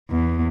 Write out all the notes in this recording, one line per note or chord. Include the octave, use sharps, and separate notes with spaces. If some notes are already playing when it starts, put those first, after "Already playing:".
E2